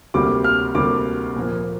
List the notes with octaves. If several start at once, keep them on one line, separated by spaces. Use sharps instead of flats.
D2 C3 G3 A#3 D6
F6
D2 C3 G3 A#3 D6
A#2 F3 A#3